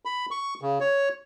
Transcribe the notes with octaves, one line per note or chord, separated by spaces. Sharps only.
B5
C#6
C#3
C#5